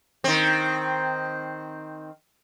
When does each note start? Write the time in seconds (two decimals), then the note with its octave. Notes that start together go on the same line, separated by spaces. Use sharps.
0.24 D#3 C4